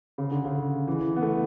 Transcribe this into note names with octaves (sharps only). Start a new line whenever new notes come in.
C#3
D3
C#3
E3
B3
A3